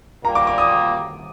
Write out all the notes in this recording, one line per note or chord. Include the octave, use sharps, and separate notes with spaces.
A#2 G3 A#3 A#5
D6
D6
D#6